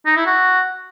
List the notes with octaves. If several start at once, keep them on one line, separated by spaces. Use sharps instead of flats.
D#4
E4
F#4